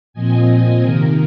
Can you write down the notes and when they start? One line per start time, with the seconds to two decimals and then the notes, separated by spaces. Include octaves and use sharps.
0.13 A#2 F3 C4 D#5 G#5
0.81 C3 D#3 A#3 A#4